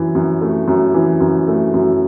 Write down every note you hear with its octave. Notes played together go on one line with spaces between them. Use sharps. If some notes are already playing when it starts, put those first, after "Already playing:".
Already playing: F#2 E3
F#2
A3
F#2
E3
F#2
A3
F#2